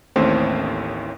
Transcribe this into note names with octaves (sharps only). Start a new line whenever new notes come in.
A1 D#2 A2 C4 C#4 C5